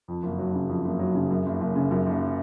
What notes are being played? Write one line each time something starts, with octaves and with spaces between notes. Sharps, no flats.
F2
F#1
F#3
C#3
F2
F#1
F#3
C#3
F#2
F#1
F#1
C#3
F#2
F#1